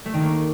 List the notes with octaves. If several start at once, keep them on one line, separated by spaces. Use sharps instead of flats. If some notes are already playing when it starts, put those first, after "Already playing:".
A3
D#3
A#3